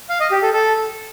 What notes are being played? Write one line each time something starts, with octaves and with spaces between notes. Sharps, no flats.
F5
D#5
G4
A4
A4